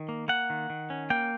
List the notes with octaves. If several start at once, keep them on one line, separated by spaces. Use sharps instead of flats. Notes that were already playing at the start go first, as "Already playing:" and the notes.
Already playing: D#3
A#3
A#3 F#5
D#3
D#3
C#4
A#3 G5